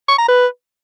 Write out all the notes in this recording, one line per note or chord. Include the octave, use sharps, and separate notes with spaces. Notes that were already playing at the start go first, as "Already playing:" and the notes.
C#6
A#5
B4